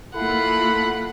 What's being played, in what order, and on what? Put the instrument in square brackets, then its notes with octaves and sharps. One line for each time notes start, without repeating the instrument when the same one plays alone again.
[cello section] A#3 F4 [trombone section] E4 A4 [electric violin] F#5 [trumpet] B5